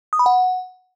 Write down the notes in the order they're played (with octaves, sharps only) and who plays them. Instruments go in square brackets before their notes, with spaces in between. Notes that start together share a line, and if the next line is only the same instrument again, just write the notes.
[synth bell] D#6
B5
F#5